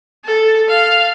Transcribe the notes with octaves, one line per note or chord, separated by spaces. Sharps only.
A4
F5